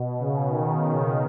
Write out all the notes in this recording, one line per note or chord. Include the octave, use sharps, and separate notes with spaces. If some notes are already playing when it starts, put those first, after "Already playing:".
Already playing: B2
C#3
D#3